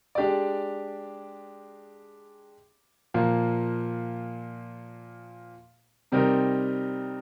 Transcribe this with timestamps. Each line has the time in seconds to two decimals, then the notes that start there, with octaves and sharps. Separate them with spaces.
0.15 G#3 D4 G4 D5
3.14 A#2 F3 A#3
6.12 C3 G3 C4 D#4 A#4